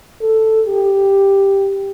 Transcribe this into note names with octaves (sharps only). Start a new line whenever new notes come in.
A4
G4